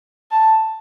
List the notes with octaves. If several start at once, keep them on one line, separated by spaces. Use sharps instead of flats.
A5